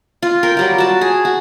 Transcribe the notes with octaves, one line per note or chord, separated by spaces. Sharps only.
F4
A#4 G5
F#3 G3 F4
F#4 A5
G#4
F#4